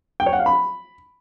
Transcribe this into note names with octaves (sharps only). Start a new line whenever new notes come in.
G5
C#5
F#5
F5
B5